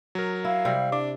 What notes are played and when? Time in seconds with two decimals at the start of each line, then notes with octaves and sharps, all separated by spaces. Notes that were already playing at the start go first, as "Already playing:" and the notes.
0.15 F#3 A#4
0.44 E4 F5
0.65 C3 G3
0.92 D4 D6